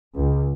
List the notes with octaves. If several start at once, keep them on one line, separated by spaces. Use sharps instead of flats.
C#2